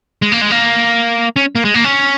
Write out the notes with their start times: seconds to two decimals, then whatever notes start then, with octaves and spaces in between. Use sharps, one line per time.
0.22 G#3
0.32 A#3
0.41 G#3
0.51 A#3
1.36 C#4
1.55 A#3
1.65 G#3
1.74 A#3
1.84 C#4